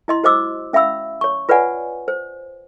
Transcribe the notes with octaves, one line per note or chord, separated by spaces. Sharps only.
E4 D#5 C6
F#4 C5 D#5 D6 E6
C#4 E5 F5 B5 E6
C#5 C#6
F4 B4 C#5 D5 F#5 G#5
C5